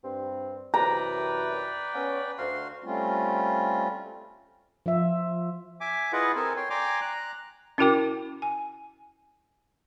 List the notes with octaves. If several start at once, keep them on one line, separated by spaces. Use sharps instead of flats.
G2 C4
F#2 C3 E3 B4 D5 G5 A#5
B3 C#4
D2 F#4 F5 C6
G3 A3 C4 C#4 F4
F3 F4 E5
E5 G#5 D6
E4 F4 G#4 B4 D#5 F#5
C4 A4 A#4 G#5
C#5 G5 C6
D5 G5 G#5 A#5 C6 D6
A#5 F#6
C#4 E4 F#4 A#4 G5 D6
G#5